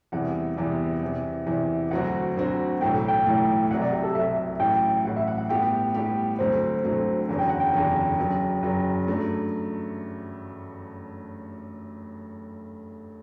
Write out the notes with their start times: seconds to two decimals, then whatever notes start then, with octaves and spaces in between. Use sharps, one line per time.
0.12 E2 C3 E3 G3 B3 F#5
0.57 E2 C3 E3 G3 B3
1.02 E2 C3 E3
1.46 E2 C3 E3
1.91 D2 D3 F#3 C4 F#4 F#5
2.36 D2 D3 F#3 C4 F#4
2.81 B1 A2 E3 A3 G5
3.08 G5
3.26 B1 A2 E3 A3
3.70 C2 C3 F#3 F#5
3.82 D5
3.93 G4
4.04 A4
4.15 C2 C3 F#3 E5
4.60 A1 A2 F#3 G5
5.04 A1 A2 F#3 F#5
5.16 E5
5.28 F#5
5.38 F#5
5.49 A2 G3 B3 E4 G4 G5
5.94 A2 G3 B3 E4 G4
6.39 D2 D3 F#3 A3 C4 C5
6.84 D2 D3 F#3 A3 C4
7.28 F#1 E2 D3 F#3
7.39 G5
7.49 F#5
7.60 G5
7.74 F#1 E2 D3 F#3
8.18 F#1 F#2 F#3
8.63 F#1 F#2 F#3
9.07 G2 F#3 A3